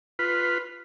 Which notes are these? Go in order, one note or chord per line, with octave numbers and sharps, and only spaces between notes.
F4 B4